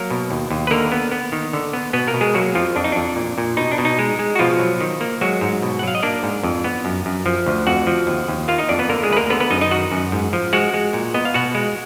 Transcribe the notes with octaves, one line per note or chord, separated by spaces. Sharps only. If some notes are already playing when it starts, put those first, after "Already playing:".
Already playing: F#3 A#3 A#4
B2
D#2
D#2
B4
D3 A#3 A#4
B3
B3
D#3
D3
B3
B2 B3 B4
A#3 A#4
B2
G#3 G#4
F#3 A#3 F#4
F2 F3 F4
F2 D4
D#4
F2 D4
A#2
A#2
B2 D#4
D4
B2
D#4
G#3
G#3
F#4
B2 F3 F4
F#3
D#3
A#3
F#3 G#3 F#4
G#2
B2
F#5
F#3 F5
D#5
A#3 D4 D5
G#2
F2
B3
F#2
F#2
F3
D2
F2 F#4 F#5
F3
D#2
D#2
A#3 F4 F5
D#4 D#5
F2 D4 D5
B3 B4
D3 A#3 A#4
G#3 G#4
D2 B4
A#3 A#4
D3 B3 B4
B3 B4
F#2 D#4 D#5
D#4 D#5
D#3 F#4 F#5
F#2
G#2
F3
G#3 F#4 F#5
G#3
A#2
B3 D#5
F5
B2 F#4 F#5
G#3